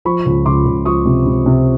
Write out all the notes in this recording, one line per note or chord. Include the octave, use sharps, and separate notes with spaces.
F3 B5 C#6
C#2
C#2 C6 D6
C#2
F3 C#6 D#6
C3
C3
C3